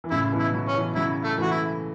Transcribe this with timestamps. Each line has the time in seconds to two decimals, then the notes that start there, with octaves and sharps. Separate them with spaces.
0.04 E3
0.11 A2 C#3 E4
0.32 B2 E3
0.39 E4
0.53 C#3 F#3
0.68 C#4
0.75 B2 E3
0.96 C#3 F#3 E4
1.24 A3
1.38 E3 A3 F#4
1.52 E4